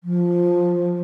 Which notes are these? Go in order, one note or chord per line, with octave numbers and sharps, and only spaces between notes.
F3